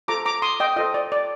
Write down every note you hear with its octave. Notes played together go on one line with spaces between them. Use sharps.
F4 A4 C5 A#5 D6
A#5 D6
C6 D#6
D#5 G5
F4 A4 C5 D#5
D5
D5